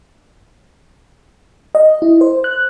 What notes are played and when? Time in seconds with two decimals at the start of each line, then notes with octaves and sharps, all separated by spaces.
1.75 D#5
2.02 E4
2.21 C5
2.44 F#6